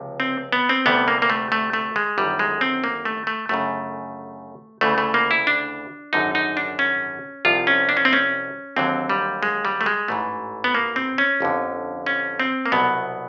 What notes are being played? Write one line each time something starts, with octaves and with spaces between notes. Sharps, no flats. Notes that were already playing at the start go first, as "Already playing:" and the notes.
Already playing: C#2 C3 F3
C4
B3
C4
D2 C3 E3 G3 B3
A#3
A#3
A3
A3
A3
G#3
G1 F#2 D#3 G3
G#3
C4
A#3
A3
A3
G1 F#2 C#3 A3
D2 C#3 E3 A3
A3
A#3
E4
D4
G#1 F#2 D3 F#3 D#4
D#4
D4
C#4
C2 C3 F3 F4
C#4
D4
C#4
C4
C#4
D#2 D3 F#3 C4
G3
G#3
G3
A3
G#3
A1 G#2 E3 A3
B3
A#3
C4
C#4
G1 F2 D3
C#4
C4
A#3
C2 B2 F#3 B3